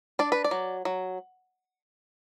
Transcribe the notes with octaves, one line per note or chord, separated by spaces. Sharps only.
D4 D5
B4
D5
F#3
F#3